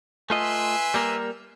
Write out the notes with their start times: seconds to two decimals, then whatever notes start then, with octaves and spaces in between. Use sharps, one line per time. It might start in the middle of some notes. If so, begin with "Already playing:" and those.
0.30 A3 F4 B4 D#5 E5 G#5 C6
0.94 G3 A#3 A#4